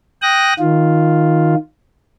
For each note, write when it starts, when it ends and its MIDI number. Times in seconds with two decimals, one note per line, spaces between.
0.22 0.53 79
0.22 0.53 87
0.22 0.53 90
0.22 0.53 94
0.59 1.55 51
0.59 1.55 65